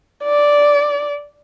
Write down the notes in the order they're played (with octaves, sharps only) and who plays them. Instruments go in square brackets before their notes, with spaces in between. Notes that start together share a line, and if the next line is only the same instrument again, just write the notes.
[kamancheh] D5